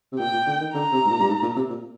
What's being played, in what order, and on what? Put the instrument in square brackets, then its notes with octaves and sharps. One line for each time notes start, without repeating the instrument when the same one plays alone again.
[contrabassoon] C3
[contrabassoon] A#2 [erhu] G5
[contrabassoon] A#2
D3
D#3
[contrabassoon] D3 [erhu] A#5
[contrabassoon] C3
G#2
A#2
G2
G#2
A#2
C3
A#2